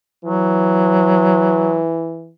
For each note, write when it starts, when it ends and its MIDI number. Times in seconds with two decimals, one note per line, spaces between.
0.25 2.32 52
0.25 1.81 54